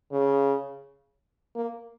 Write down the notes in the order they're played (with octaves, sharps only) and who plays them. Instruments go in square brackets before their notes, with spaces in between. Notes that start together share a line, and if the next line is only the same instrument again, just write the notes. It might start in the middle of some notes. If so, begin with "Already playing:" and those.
[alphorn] C#3
A#3